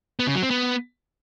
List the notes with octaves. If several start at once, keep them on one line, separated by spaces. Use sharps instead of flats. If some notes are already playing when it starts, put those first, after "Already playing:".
B3
C#3
F#3
C4
B3